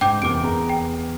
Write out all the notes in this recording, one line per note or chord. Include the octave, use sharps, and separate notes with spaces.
G#2 G5 D6 G6
E2 C3 A#3 D6 D7
E2 G#4 A#5
G5